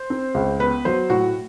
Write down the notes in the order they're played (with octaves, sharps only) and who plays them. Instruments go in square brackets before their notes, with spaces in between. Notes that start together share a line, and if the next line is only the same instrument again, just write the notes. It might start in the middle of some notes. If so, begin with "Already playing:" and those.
Already playing: [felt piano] C5
[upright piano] C4
C#2
[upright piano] B3 [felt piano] B4
[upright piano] F#3 [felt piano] C5
[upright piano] A2 [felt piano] F#4